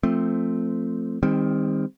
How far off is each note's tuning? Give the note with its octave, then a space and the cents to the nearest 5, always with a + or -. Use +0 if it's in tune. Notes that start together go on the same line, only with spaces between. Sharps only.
F3 -10 A3 +10 C4 +0
D#3 +0 G3 +40 C4 +0